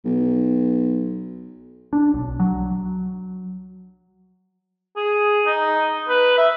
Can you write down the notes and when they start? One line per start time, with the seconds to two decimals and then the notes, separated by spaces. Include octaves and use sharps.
0.05 B1
1.93 D4
2.14 B1
2.40 F#3
4.97 G#4
5.46 D#4
6.08 B4
6.38 E5